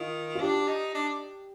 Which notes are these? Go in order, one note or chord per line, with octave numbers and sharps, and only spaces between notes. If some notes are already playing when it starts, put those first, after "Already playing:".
Already playing: D#3 F4
F4
D4 G4
D#4
D4